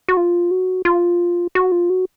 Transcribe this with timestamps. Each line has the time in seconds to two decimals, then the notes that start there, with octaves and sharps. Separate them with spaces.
0.09 F#4
0.17 F4
0.51 F#4
0.85 F4
1.55 F#4
1.72 F4
1.90 F#4